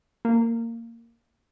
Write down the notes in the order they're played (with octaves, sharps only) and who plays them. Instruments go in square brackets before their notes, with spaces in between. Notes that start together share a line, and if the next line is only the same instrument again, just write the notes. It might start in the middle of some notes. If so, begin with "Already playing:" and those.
[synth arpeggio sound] A#3